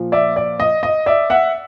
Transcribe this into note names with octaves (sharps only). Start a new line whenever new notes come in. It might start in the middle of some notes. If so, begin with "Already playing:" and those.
Already playing: A#2 F3
D5 E5
D5
D#5
D#5
D5 E5
E5 F#5